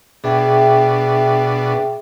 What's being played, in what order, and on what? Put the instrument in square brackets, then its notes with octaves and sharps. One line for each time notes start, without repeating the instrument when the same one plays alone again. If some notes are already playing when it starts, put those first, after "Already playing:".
[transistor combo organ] B2 D4 [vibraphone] G#4 E5 G5